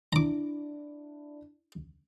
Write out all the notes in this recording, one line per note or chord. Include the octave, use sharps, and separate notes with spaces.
D4 E4 A#5 D6